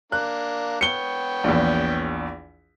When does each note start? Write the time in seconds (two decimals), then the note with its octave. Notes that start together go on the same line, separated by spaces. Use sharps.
0.12 A#3 D4 F#6
0.81 B3 C#5 G5 C#7 G7
1.44 A#1 E2